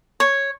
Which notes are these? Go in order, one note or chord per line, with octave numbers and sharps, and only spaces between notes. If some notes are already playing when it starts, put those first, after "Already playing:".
C#5